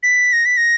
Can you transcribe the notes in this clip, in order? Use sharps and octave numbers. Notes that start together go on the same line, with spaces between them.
B6
A#6
B6
A#6